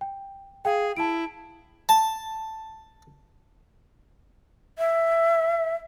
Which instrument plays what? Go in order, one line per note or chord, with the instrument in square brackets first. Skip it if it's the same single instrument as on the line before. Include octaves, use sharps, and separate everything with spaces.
[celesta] G5
[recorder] G#4 [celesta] F5 G5
[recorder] E4 [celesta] A5 D7
[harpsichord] A5
[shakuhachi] E5